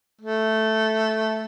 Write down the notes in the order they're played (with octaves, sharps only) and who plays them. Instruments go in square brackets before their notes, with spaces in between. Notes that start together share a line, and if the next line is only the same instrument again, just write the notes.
[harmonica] A3